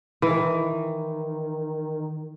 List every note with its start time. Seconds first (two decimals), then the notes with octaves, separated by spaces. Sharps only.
0.22 D#3 E3